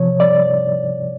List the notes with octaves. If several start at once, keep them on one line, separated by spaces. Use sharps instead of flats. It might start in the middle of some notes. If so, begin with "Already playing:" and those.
Already playing: C3 F3 C#5
D5